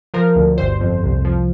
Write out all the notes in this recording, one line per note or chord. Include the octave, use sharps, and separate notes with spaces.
F3 A#4
D2
G1 C5
F2
C2
F3